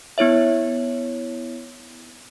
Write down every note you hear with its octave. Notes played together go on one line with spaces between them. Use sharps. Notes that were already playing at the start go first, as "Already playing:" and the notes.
B3 E4 C#5 E5